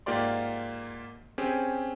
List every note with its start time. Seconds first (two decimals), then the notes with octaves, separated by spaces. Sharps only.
0.06 G#2 A#3 F4 G4 D5 C6
1.38 C4 C#4 G4 G#4